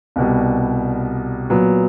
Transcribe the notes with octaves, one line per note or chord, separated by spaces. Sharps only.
C2 B2 G3
A#2 F#3 B3